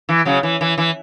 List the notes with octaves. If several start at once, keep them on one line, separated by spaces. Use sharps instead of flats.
E3
C#3 F#3
E3
E3
E3